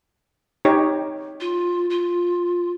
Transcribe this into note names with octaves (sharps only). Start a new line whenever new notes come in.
D#4 G4 C#5
F4
F4